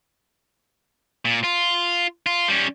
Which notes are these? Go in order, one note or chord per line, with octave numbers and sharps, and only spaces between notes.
A#2
F4
F4
G3 C#4